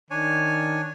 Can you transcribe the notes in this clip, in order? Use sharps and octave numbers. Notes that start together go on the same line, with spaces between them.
D#3 D4 C#5 G#5